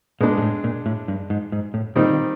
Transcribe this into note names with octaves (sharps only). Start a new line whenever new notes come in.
A#2 G#3 B3 D4
G#2
A2
A#2
A2
G2
G#2
G#2
A2
A#2 D#3 G3 C4 D#4